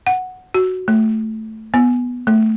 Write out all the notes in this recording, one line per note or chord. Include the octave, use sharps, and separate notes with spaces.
F#5
F#4
A3
B3
A3